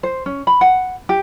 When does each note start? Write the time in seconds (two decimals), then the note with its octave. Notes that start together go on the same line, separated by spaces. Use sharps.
0.03 C5
0.26 C#4
0.47 B5
0.61 F#5
1.09 G4